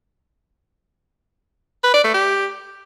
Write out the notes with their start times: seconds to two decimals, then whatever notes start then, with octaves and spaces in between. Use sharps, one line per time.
1.84 B4
1.94 D5
2.04 A3
2.14 G4